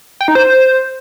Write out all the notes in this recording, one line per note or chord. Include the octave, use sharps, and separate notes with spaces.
G5
D#4
C5